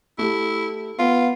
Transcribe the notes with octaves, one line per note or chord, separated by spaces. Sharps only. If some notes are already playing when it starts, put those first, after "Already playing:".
A3 E4 G4
B3 F4